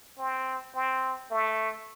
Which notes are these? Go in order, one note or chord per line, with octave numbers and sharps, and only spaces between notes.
C4
C4
A3